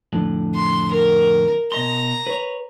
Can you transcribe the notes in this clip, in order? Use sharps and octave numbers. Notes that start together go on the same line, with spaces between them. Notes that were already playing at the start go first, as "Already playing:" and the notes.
F2 A2 D3
C6
A#4
B2 D#5 A#5 C6
B4 C#5